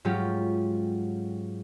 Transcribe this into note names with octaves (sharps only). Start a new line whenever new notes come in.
G#2 F#3 C#4 F4 G4